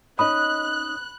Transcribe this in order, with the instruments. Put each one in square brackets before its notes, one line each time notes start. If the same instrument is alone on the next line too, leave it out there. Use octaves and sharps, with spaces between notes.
[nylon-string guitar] C#4 D#4 D#5 [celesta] B5 [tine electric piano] D#6 [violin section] F#6